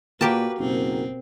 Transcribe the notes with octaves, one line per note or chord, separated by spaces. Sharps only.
A#2 A#3 F#4 G4 A#4 B4 G5 A5
F#1 B2 C4